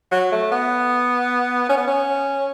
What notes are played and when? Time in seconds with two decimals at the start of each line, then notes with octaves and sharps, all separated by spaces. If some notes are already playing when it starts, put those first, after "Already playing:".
0.12 F#3
0.32 A3
0.51 B3
1.69 C#4
1.77 B3
1.87 C#4